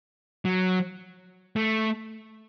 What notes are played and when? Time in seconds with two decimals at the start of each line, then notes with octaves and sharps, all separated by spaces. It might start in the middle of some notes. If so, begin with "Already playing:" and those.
0.45 F#3
1.56 A3